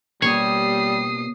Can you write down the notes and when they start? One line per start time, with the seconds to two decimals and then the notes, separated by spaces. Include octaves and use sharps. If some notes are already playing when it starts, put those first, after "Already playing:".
0.22 B2 G3 A#3 G4 C#5 D#6 C7